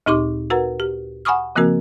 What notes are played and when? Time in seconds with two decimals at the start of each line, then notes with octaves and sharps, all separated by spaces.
0.06 D2 A#2 D#4 G4 C6 D6
0.50 F#4 A#4 B4 F#5 A#5
0.80 G4
1.25 F#5 G#5 B5 C#6 D#6 F6
1.56 C#3 F3 A#3 C4 F#4 A#4